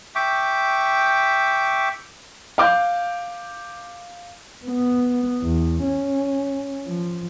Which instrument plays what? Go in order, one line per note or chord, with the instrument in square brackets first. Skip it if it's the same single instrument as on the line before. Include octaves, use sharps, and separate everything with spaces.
[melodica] E5 G5 C#6 D6
[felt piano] F5 D6 G6
[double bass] B3
E2
C#4
F3